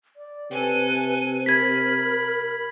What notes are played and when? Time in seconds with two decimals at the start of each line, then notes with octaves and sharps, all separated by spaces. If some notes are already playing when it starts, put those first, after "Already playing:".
0.17 D5
0.51 C3 A4 B4 G#5
1.46 A#4 B5 G#6 B6